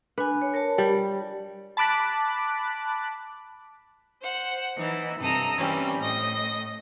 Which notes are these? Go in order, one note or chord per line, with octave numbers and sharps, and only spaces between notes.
D4 B4 G#5
C#5
A#4 C#5 A5
G3
A5 B5 D6 F#6 B6
C5 F#5
E3 D#4 E4
G2 C3 A4 A#5 D#6
E3 G3 C4 C#4
A2 D#5 A#6